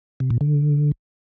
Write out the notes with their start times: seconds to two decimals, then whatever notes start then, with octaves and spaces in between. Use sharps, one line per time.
0.20 C3
0.30 A#2
0.41 D3